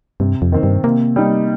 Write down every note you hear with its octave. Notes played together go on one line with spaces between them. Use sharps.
G2 C3
F2
D#3 C4
G2
C3 A#3
G3 D#4